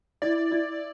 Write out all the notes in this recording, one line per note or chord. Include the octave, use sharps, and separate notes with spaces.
E4 D5
E4